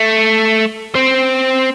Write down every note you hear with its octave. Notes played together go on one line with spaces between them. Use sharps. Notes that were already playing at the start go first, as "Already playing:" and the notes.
Already playing: A3
C4